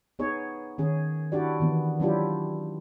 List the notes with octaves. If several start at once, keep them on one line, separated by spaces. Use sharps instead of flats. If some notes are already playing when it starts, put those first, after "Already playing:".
B3 D#4 G#4 C#5
D#3 C#4 G#4
D4 E4 F#4 G4 D5
D#3 E3 B3
F#3 C#4 D4 E4 F4 G4